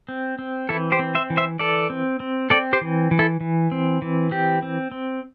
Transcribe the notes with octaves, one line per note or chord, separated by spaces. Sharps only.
C4
C4
E3 E4 A4
G4 C5
C4
C5 E5
E3
C5 E5
E3 A4 D5
C4
C4
C4 A4 D5
G4 C5
E3
E3
E4 A4
E3
C4
E3
C4 G4
C4
C4